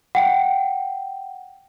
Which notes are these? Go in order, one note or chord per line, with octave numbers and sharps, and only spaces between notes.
F#5 G5